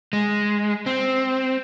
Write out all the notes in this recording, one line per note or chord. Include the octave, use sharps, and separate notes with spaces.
G#3
C4